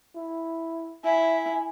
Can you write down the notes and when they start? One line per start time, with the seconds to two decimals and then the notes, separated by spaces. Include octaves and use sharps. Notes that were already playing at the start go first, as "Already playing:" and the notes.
0.15 E4
1.04 E4 E5 G#5